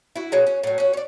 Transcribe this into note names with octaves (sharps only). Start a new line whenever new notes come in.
E4 F#4
B2 F#3 G#3
C#4
A2 F#3
C#4 F#4
C#5 D5